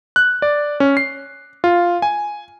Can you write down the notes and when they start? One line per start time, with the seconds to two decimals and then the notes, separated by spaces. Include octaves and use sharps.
0.16 F#6
0.42 D5
0.80 C#4
0.97 C7
1.64 F4
2.02 G#5